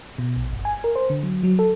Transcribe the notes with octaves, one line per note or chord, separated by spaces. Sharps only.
B2
A#1
G1
G#5
A#4
C5
D3
F#3
F#3
A4